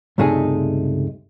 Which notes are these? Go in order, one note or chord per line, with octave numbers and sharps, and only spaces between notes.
C#2 G2 C3 A3 D#4 G#4